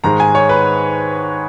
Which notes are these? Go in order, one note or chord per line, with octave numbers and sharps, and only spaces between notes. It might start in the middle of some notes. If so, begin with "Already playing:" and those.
G#2 D#3 G#3 A#5
G#5
C#5
B4